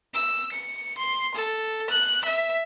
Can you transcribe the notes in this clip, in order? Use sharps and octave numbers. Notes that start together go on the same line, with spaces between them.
E6
C#7
C6
A4
F#6
E5